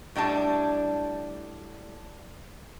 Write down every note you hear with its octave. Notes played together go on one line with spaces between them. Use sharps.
A2 G3 D4 A5